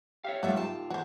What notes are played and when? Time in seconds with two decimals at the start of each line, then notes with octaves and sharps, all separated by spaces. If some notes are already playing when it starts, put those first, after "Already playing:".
0.24 G4 C#5 E5 F5
0.43 G#2 F#3 G3 A3 F4 F#4 E5
0.56 G5 A5
0.90 E3 F#4 C5